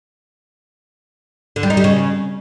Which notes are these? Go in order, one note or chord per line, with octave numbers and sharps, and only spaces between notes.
D3
G3
D#4
G3
C#3